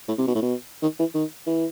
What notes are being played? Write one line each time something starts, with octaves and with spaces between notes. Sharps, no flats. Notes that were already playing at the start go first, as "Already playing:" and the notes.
A2
C3
B2
A2
B2
D#3
E3
D#3
E3